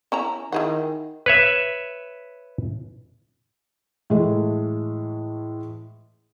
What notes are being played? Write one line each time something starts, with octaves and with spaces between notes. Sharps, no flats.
C#4 E4 A#5
D#3 E4 G#4 F#5
B4 C#5 E5
A2 E3 G#3 A3